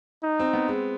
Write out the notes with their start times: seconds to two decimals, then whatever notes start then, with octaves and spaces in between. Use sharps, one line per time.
0.24 D#4
0.40 C4
0.53 B3
0.68 G#3